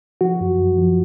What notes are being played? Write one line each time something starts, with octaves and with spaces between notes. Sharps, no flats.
F3 F#4
F#2
F#2
F3